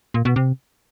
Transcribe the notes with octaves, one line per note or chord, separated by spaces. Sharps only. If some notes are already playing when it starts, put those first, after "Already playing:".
A#2
B2
C3